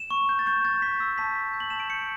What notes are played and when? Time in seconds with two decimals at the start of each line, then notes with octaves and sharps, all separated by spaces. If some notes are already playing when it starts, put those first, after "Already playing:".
Already playing: E7
0.11 C#6
0.29 G6
0.39 A6
0.46 C#6 G6
0.65 G6 A6
0.82 C#6 B6
1.00 E6
1.18 A5 B6
1.36 A5
1.53 G6
1.60 F#7
1.70 A5 E7
1.80 D7
1.90 G6 C#7